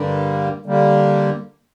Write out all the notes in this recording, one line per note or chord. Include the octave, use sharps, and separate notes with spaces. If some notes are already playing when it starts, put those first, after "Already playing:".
Already playing: G2 D3 G3 A#3
D3 G3 A#3